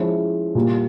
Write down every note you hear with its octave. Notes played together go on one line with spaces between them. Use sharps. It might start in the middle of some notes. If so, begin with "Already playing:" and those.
Already playing: F3 G#3 C#4 E4
A#2 G3 A#3